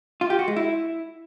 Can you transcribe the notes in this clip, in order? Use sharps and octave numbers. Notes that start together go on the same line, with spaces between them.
F4
G4
F#4
G#3
E4